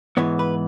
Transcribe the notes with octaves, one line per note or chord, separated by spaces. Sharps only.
G#2 E3 B3 C#5
B4